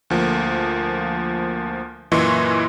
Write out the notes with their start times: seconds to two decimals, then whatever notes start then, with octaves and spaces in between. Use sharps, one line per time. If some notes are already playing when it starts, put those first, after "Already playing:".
0.10 D2 F3 A#3
2.12 F#2 A#2 E3 D#5 C6 C#6